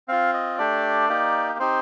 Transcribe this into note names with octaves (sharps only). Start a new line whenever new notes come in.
C4 F4 F5
D#5
A3 D4 G4 D5
A#3 D#4 G4
C4 D#4 G4 C5